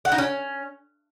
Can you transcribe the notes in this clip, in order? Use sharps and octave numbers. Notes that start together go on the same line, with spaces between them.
F#5
D#4
C#4